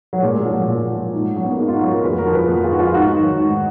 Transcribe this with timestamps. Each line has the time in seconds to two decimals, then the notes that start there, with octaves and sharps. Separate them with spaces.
0.13 F#3
0.23 A#2 G#3
0.38 G#3
0.45 F3
0.53 F#3
0.68 A#2
0.91 F3
1.13 G#2
1.36 F#3 C#4
1.44 B3
1.51 A#3
1.58 G#2 G#3
1.68 F4
1.73 D#4 F#4
1.81 F#3
1.88 F#4 A#4
2.04 F2 G#4 B4
2.18 F#4 A#4
2.26 F3
2.34 G#4 B4
2.49 F2
2.63 F4 G#4
2.72 F3 F#4
2.79 F4 G#4
2.93 G#2 D#4 F#4
3.16 D#3 F#3
3.39 G#2